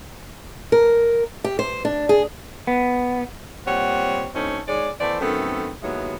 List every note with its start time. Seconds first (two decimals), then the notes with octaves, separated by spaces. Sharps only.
0.72 A#4
1.44 G4
1.59 C5
1.85 D4
2.09 G#4
2.67 B3
3.66 A#2 G3 C4 C#5 F#5
4.34 D2 A3 C4 C#4 D#4
4.66 D#3 G#3 C#5 D5
5.00 E3 A3 B3 C5 D5
5.21 F#2 D#3 A3 B3 C4 A4
5.82 D#2 F#3 G#3 B3 E4 C#5